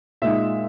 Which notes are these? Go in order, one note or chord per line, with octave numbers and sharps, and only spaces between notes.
A#2 G#3 D#4 E5